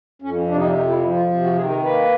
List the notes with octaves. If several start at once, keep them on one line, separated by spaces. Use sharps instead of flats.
F2 C#4
C3 D4
D#4
D4
F2 D#4
E4
F3 E4
F4
C3
F#4
D#3 G#4
A#4
A#3 B4